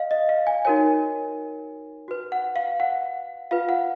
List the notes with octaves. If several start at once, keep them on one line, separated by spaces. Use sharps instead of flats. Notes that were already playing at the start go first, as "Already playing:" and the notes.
Already playing: D#5 F5
D#5
F5
G#5
D#4 F#4 A#4 C#5 G#5
F#4 B4
F#5
F5
F#5
F4 B4 F5
F#5